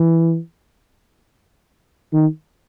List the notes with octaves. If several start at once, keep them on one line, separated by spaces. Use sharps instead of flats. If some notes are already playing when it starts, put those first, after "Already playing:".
Already playing: E3
D#3